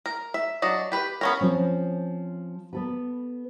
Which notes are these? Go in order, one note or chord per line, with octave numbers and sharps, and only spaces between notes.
A#4
E5
F#3 D4 D#5
G4 B4
B3 C#4 A#4
F3 C4 C#4
B3 A4 B4